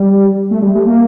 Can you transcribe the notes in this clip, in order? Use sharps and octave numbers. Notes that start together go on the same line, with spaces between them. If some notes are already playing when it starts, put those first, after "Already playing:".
Already playing: G3
A3
G3
A3
A#3